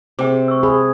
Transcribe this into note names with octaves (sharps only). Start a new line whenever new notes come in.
C3 G#4 G5 D6
C#6 E6
G#4 B5